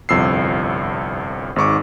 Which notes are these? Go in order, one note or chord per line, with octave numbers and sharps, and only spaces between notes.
G1 C2 F2 E6 C7
G#1 G#2 C#6 D6